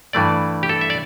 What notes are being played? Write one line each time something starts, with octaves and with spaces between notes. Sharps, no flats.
G2 E3 A3 D5
G4
A4
E5
D5